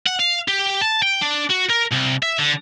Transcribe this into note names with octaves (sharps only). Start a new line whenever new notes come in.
F#5
F5
G4
A5
G5
D4
F#4
A#4
C2
E5
D3